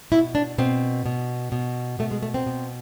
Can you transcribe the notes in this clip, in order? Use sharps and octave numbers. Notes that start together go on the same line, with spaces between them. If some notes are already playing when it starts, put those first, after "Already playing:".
B2 E4
D4
B2 C4
B2
B2
B2 A3
G#3
A3
C4
B2